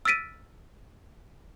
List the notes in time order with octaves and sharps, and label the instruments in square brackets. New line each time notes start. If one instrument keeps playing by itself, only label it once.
[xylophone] E6 F6 A6 B6 D7 D#7